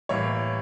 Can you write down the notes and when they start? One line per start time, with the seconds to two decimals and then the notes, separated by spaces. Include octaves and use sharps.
0.09 A2 E3 G3 A#3 C#5